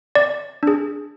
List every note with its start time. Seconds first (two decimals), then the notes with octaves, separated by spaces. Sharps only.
0.15 D5
0.63 D4 G#4